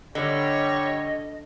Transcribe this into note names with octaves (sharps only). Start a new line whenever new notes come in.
D3 G3 C#5 D#5